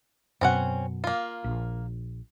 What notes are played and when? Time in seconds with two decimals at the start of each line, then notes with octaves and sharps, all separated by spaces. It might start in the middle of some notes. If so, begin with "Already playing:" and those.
0.41 F#2 B2 C4 C#4 F#5
1.04 A#3 F4
1.44 A#1